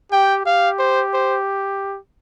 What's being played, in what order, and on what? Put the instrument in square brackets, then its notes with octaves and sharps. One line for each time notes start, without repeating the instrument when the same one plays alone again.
[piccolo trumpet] G4 [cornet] G5
[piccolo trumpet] G4 [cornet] F5
[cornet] C5
C5